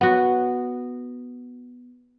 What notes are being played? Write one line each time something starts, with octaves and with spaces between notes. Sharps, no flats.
B3 F#4